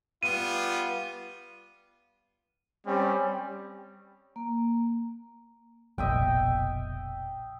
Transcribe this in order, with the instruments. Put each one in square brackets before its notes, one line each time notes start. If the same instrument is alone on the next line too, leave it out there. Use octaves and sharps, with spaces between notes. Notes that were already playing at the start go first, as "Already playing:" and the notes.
[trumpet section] G3 B3 F4 [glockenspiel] D#7
[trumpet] G3 [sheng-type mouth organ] C4 C#4
[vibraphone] A#3
[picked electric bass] F1 A#1 B2 [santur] D#5 E5 G5